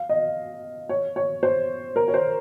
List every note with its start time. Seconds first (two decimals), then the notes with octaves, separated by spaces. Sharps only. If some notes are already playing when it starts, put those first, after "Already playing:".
Already playing: F5
0.09 D#5
0.89 C#5
1.16 C#5
1.43 C5
1.96 A#4
2.08 C#5
2.14 C5